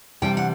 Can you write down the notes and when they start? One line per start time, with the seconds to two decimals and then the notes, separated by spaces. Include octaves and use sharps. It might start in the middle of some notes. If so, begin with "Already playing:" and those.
0.22 C3 E3 G3 D4 G5
0.37 F#5